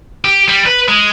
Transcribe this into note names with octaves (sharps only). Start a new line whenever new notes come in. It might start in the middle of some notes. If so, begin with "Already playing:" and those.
G4
G3
B4
G#3